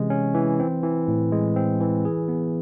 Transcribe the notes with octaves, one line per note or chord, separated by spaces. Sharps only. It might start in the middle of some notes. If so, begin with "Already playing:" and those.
Already playing: C3 E3 G#3 C#4
C#4
E3
C4
E3
A2
G#3
C4
E3
G#4
B3